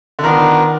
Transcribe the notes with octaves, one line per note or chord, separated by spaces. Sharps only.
D3
D#3 B3 D4 F4 A#4